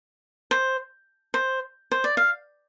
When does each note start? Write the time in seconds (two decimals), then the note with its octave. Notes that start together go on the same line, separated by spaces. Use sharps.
0.51 C5
1.34 C5
1.92 C5
2.04 D5
2.17 F5